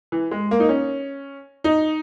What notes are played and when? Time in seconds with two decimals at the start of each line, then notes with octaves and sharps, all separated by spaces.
0.12 E3
0.31 G#3
0.51 A#3
0.60 D#4
0.69 C#4
1.64 D#4